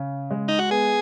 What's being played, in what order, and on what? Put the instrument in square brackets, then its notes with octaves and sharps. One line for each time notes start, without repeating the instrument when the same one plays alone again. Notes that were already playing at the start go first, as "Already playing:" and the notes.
Already playing: [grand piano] C#3
G#3
[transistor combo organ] D#4
F#4
[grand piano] B3 [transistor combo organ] G#4